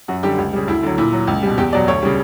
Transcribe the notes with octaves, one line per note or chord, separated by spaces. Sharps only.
F#2 F#4
D3 G3 G4
C#2
C#3 G3
D2 E4
D3 F#3
A#2 E4
F#3
C#2
B2 G3
E2 G4
B2 F#3 D5
D2 C#5
C#3 G3